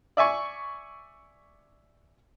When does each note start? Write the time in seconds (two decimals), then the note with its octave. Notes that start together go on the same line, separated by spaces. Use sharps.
0.17 D5 E5 G#5 C#6